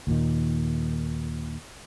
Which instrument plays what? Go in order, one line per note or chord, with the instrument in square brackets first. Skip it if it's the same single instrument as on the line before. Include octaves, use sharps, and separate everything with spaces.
[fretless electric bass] D#2 A#2 D#3